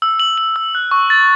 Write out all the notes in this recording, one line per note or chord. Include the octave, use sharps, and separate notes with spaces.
E6
F#7
F#7
E6
F#6
C#6
A6